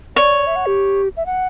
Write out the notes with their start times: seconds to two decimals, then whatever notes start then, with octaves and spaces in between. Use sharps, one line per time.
0.16 C#5 D5
0.47 E5
0.56 F#5
0.66 G4
1.17 E5
1.26 F#5